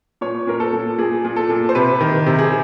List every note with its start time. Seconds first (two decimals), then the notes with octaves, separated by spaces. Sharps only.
0.21 A#2 C#5
0.47 A#2 A#4
0.60 A4
0.73 A#2
0.98 A#2 G#4
1.25 A#2
1.36 A4
1.50 A#2
1.69 C5
1.75 C3 B4
2.01 D#3
2.26 C3
2.39 G#4